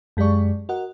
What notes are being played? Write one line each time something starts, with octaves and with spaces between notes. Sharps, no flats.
F#2 G#3 G4 G#4 D5 C#6
F#4 A#4 D#5 F#5